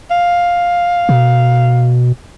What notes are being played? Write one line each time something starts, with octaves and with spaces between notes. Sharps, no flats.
F5
B2